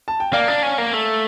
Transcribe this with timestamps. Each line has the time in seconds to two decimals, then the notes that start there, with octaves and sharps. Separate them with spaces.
0.08 A5
0.20 G5
0.33 A#3 D5 F5
0.48 D4
0.63 C#4
0.78 A#3
0.93 A3